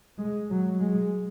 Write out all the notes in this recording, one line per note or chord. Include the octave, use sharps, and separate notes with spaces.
G#3
F#3
G#3